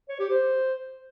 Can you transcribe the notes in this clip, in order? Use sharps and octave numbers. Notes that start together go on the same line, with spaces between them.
C#5
G4
C5